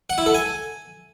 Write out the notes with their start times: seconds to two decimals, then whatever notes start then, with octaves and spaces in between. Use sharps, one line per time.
0.10 F#5
0.18 E4
0.26 A4
0.35 G#5